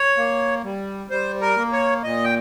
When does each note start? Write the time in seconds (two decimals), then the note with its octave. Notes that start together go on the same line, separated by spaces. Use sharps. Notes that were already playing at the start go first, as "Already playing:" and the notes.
Already playing: C#5
0.17 A#3
0.64 G3
1.10 G3 C5
1.41 A#4
1.57 A#3
1.72 C#5
2.03 A#2 D#5
2.24 G5